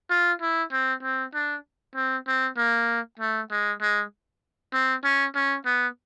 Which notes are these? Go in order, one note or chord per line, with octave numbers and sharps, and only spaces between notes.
F4
E4
C4
C4
D4
C4
C4
A#3
A3
G#3
G#3
C4
C#4
C#4
B3